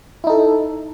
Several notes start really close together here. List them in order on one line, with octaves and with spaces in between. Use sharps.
E4 D#4 A4